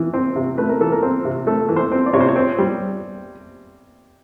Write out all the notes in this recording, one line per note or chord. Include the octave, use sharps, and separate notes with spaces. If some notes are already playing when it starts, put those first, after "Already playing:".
Already playing: E3
C4
C3
A3 B4
A#4
E3 A4
A#4
C4
C3
A3 A4
E3
C5
C4
D5
C3 C#5
C5
C#5
C4
G3